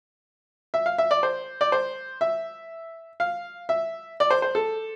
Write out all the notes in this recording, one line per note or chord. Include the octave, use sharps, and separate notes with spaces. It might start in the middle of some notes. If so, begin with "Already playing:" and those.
E5
F5
E5
D5
C5
D5
C5
E5
F5
E5
D5
C5
C5
A4